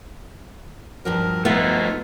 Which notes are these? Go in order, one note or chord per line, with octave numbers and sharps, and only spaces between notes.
G2 F3 F#3 A#4
A3 B3 D#4 F4